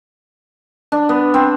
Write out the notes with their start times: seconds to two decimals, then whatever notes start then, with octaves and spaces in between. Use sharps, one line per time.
0.92 D4
1.09 B3
1.34 C4